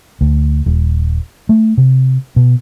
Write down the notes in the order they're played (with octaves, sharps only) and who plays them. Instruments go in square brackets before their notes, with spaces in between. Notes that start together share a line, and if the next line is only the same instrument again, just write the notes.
[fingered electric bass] D2
D#1
A3
C3
B2